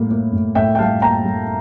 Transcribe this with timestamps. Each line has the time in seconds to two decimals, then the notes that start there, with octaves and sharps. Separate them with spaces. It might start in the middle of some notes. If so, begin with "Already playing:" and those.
Already playing: A2 G3 A#3
0.11 A#3
0.33 A2
0.55 A2 E5 G5
0.75 G5
0.79 G3 F5 A5
1.02 A#3 G5 A#5
1.24 G3